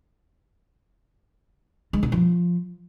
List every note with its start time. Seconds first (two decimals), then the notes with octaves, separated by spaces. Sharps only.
1.93 G#3
2.03 B2
2.12 F3